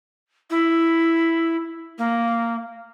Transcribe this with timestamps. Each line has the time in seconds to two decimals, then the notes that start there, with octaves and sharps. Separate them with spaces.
0.50 E4
1.98 A#3